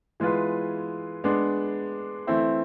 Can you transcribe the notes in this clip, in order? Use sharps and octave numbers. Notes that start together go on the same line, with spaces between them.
E3 G#3 B3 F4 B4
G#3 B3 D4
E3 A3 C4 E4